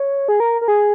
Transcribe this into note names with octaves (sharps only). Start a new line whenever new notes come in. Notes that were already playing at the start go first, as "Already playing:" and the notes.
Already playing: C#5
G#4
A#4
A#4
G#4